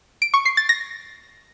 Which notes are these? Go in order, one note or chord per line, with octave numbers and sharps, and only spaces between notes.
D7
C#6
C7
A6
A#6